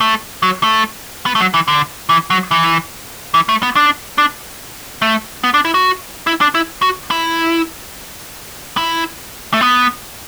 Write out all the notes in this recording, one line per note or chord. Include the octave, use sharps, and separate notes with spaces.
A3
F#3
A3
B3
A3
F#3
E3
D3
E3
F#3
E3
E3
A3
B3
D4
D4
A3
B3
D4
E4
F#4
E4
D4
E4
F#4
E4
E4
A3
B3